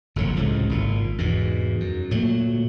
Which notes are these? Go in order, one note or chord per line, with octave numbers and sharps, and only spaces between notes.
F#1 F2 D3 F#3
C#2 A2 C3
G#1 A#2
E2 G#2 B2
F#2
D2 A#2 F#3 A3